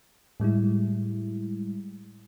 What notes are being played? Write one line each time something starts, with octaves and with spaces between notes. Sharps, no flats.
A2 G3 G#3 E4